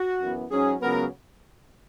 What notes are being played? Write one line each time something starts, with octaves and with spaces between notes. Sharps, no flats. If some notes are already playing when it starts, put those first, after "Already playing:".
Already playing: F#4
F#2 E3 B3
G#2 F#3 C#4 G#4
C#2 C#3 F#3 B3 A#4